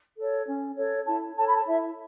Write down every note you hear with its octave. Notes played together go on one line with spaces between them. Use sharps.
A4 C#5
C#4
A4 C#5
E4 A5
A4 C#5 A5
B5
A5
E4 E5